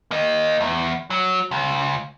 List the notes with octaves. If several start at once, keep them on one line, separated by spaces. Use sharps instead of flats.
A#3 D#5
E2
F#3
C#2